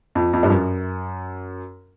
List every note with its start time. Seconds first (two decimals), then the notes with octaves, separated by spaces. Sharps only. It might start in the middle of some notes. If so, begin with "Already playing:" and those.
0.15 F2
0.33 F2
0.43 G2
0.50 F#2